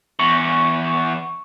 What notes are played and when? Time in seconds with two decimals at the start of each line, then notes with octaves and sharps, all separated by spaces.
0.19 E2 C#6